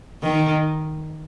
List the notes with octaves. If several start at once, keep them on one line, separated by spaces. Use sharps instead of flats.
D#3